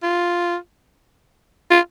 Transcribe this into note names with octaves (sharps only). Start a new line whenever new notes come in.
F4
F4